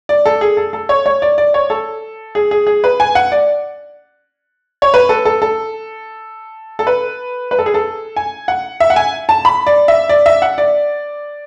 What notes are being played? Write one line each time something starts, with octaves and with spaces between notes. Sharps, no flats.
D5
A4
G#4
A4
A4
C#5
C#5
D5
D5
C#5
A4
G#4
G#4
G#4
B4
G#5
F#5
D5
C#5
B4
A4
A4
A4
A4
B4
B4
A4
G#4
A4
G#5
F#5
E5
F#5
G#5
A5
B5
D5
E5
D5
E5
F#5
D5